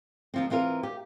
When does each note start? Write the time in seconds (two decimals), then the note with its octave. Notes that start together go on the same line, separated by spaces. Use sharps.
0.34 D#2 F3 C4
0.50 E3 C4 F4 A#4
0.83 G4